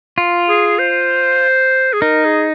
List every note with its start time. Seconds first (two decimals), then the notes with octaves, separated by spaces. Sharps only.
0.18 F4
0.49 G#4
0.79 C5
1.93 G#4
2.02 D#4 A#4
2.25 G#4